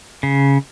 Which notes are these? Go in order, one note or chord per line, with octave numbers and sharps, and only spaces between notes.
C#3